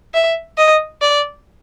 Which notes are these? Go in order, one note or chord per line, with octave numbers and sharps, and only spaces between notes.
E5
D#5
D5